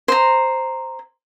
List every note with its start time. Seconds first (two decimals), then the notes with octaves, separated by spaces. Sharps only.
0.08 C5 A#5